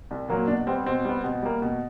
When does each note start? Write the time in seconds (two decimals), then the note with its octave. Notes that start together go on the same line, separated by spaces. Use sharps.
0.11 C2
0.29 A#2 F#3 A#3
0.48 B2 D4
0.67 G3 B3 C4
0.86 B2 C4
1.05 G3 B3
1.24 B2
1.42 G3 A#3
1.62 B2